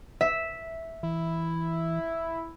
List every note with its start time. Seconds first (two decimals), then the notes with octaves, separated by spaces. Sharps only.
0.21 E5
1.03 E3 E4